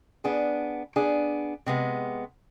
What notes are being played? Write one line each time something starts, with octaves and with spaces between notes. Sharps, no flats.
B3 D4 G#4
B3 D4 G#4
C3 G#3 B3